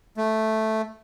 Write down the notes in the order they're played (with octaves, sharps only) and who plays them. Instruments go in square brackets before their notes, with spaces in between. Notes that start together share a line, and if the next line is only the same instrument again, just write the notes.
[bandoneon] A3